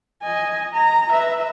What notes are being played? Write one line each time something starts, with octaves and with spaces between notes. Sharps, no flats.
D#5 G#5
A#5
B4 E5